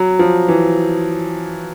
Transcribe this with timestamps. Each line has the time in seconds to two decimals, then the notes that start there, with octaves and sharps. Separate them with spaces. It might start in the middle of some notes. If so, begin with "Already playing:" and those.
Already playing: F#3
0.19 F3
0.48 E3